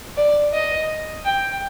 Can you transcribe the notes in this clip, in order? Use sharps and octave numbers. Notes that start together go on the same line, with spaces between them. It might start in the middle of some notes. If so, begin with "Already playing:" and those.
D5
D#5
G5